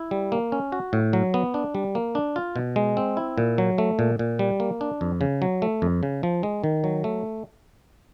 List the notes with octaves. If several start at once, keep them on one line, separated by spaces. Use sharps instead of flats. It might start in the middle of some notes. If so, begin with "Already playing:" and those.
Already playing: E4
G3
A#3
C#4
F#4
A2
F#3
B3
D4
G3
A#3
D4
F4
B2
G#3
C4
E4
A#2
F#3
A3
A#2
A#2
G3
A#3
D4
F2
C#3
F#3
A3
F2
C#3
F3
G#3
D#3
F#3
A3